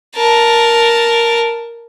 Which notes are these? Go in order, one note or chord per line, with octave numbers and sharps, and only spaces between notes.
A#4 A5